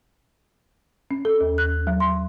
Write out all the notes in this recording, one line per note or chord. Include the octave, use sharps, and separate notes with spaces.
C#4
A4
D#2
F#6
F#3
C6